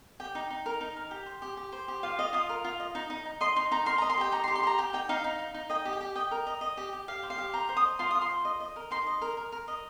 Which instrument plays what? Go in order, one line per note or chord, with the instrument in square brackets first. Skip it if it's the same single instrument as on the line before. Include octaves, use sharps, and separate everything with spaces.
[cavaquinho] G4 G5
D#4
D#4
A#4
D#4
A#4
G4
C5
G4
G4
C5
G4
F4 F5
F4 D#5
F4 D#6
A#4
F4
D#5
D#4
D#4
D#4
D#5 C6
D#4 C6
D#4 A#5
A#4 C6
D#5 A#5
C6
G4 G5
D#4 A#5
C6
G4
C6
G4 A#5
G4 G5
D#4 G5
D#4 F5
D#4
D#4
D#4
D#5 G5
G4
G5
G4
D#5 G5
A#4
D#5
D#5
G4
G4
G4 F5
C5
F5
G4
C5 A#5
C5
D#6
D#5
F4 C6
F4 D#6
C6
C5
D#5
D#5
A#4
D#4 C6
D#5
A#4
A#4
A#4
D#5